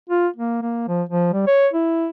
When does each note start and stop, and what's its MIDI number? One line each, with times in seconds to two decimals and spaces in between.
0.10 0.28 65
0.36 0.58 58
0.62 0.87 58
0.88 1.03 53
1.09 1.29 53
1.33 1.47 55
1.47 1.67 73
1.73 2.08 64